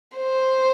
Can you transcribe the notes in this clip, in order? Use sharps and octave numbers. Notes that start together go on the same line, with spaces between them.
C5